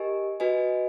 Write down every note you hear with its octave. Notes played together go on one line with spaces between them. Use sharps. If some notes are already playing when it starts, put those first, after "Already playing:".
Already playing: G4 A#4 D#5 G#5
F#4 B4 D#5 G#5